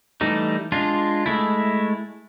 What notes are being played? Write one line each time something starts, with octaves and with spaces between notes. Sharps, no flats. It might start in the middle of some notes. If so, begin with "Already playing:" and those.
E3 G3 A3 D#4
G#3 D4 F4
G#3 A3 E4